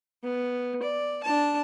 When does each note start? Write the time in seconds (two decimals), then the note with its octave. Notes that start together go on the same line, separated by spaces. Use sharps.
0.23 B3
0.82 D5
1.23 D4 A5